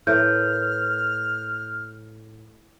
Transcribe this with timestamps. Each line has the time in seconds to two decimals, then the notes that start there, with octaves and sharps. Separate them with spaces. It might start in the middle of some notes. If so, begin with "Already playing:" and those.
0.07 A2 A#4 B4 F6 G6